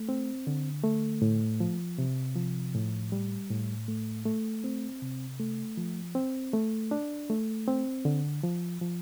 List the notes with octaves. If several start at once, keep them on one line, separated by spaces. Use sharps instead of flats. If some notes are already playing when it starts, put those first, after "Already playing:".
Already playing: A3
C4
D3
A3
A2
F3
C3
F3
A2
G3
A2
A3
A3
C4
C3
A3
F3
C4
A3
D4
A3
C4
D3
F3
F3